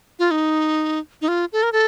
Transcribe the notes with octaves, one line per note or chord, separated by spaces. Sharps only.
F4
D#4
D#4
F4
A4
A#4
A4